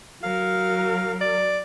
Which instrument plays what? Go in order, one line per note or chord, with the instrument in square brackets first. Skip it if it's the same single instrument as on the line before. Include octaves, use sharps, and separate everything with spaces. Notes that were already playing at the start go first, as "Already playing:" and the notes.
[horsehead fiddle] F#3 A#4 [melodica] F5
[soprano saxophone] D5